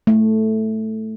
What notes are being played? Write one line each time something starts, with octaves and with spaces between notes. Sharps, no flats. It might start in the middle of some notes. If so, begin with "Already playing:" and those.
A3